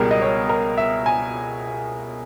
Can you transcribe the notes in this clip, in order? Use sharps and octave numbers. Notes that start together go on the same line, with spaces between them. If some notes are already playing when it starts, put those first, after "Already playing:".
Already playing: C#2 B2 G3 G#4 A#4
D#5
C#5
A#4
E5
G#5